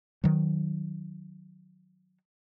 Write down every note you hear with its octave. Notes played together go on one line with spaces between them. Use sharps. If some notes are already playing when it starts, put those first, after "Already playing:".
D#3 F#3